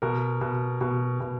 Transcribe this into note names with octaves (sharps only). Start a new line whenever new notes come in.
B2 A#4
B2
B2
B2